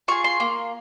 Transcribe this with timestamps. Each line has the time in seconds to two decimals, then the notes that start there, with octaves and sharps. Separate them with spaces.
0.08 F4 G#4 C#6
0.24 C6
0.40 A#3